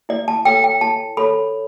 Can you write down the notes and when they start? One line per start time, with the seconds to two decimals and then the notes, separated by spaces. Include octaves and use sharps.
0.09 E4 D5
0.28 A5
0.45 A4 C#5 G5
0.64 G5
0.81 E4 A5
1.17 A4 C#5 B5